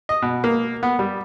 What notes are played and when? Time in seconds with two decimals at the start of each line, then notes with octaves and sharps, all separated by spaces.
0.09 D#5
0.22 B2
0.44 A#3
0.83 B3
0.99 G3